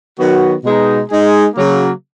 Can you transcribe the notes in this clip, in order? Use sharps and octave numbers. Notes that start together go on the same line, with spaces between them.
D#3 F#3 B3 F#4
B2 G#3 D#4
G#3 D#4 G#4
C#3 F#3 A#3